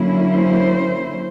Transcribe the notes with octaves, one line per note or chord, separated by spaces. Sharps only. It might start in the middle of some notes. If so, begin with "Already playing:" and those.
Already playing: D3 F#3 A#3 C#4 E4
C5